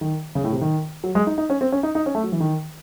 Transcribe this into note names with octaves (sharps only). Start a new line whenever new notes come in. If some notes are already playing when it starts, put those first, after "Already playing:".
D#3
C#3
A2
C3
D#3
F#3
G#3
D#4
D#4
C#4
C4
C#4
D#4
D#4
C#4
A3
F#3
E3
D#3